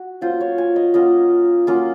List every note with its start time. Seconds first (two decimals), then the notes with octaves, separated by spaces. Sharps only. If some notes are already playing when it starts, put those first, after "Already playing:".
Already playing: F#4
0.21 F#3 A#3 C#4 F4 C5
0.41 C#5
0.58 G#5
0.76 D#5
0.94 F#3 A#3 C#4 F4 D#5
1.67 F#3 A#3 C#4 F4